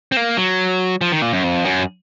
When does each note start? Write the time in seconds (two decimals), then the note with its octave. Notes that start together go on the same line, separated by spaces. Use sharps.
0.12 C4
0.17 A#3
0.37 F#3
1.01 F3
1.12 D#3
1.22 A#2
1.33 F#2
1.43 F2
1.65 F#2